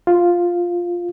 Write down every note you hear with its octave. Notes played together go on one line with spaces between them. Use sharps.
F4